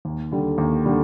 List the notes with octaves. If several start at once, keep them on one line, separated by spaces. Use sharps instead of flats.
D#2
D3 G3
D#2
D3 G3